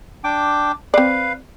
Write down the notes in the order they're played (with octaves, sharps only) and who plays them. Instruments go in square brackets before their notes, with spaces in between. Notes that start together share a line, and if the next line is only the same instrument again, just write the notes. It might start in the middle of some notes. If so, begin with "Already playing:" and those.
[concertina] D4 G5 D6
[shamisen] C4 D5 [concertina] B4 F5